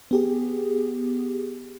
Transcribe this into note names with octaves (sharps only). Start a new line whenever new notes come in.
B3 G4 G#4